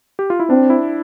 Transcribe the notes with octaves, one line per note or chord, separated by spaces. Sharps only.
G4
F4
E4
C4 D4
E4